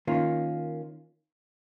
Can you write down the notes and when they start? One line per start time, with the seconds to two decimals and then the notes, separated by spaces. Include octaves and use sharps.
0.07 D#3 A#3 C#4 F4